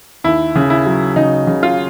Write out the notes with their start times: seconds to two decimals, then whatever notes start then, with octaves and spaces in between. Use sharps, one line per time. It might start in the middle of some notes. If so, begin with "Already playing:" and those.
0.24 D#2 E4
0.55 C#3
0.70 E4
0.86 F#3
1.16 C#3 D#4
1.47 C#3
1.63 F4